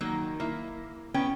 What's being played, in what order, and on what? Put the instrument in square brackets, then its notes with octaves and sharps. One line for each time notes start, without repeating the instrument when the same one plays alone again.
[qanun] D#3 D#4 [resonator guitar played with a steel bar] F#3 A#3
[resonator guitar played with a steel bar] A#3 [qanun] E4 E5
[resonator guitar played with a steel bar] B3 C#4 G5